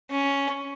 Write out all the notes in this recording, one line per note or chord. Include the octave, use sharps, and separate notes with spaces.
C#4